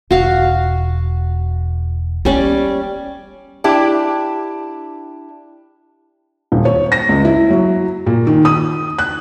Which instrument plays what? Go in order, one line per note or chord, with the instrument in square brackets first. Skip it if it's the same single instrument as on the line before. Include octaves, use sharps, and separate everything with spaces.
[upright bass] E1 [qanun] F#4 F5
[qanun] G3 C#4 D5 [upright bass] A#3 B3
[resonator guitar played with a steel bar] D4 E4 G4
[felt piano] D#1
C#5
A#6
C#2
E4
F#3
A#2
D#3
D#6
F#6